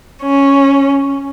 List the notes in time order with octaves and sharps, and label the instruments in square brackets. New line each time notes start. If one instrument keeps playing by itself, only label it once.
[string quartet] C#4